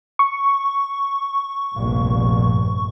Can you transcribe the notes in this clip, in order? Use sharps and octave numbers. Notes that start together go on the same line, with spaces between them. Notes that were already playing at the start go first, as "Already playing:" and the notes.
C#6
F1 A#1 G2